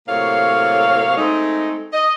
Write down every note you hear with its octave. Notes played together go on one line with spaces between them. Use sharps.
A2 C3 F#3 A#3 C#5 F5
G#3 A3 C4 D#4
D#5